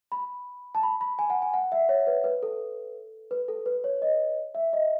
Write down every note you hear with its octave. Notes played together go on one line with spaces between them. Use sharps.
B5
A5
B5
B5
G#5
F#5
G#5
F#5
E5
C#5
B4
B4
A4
B4
A4
B4
C#5
D#5
E5
D#5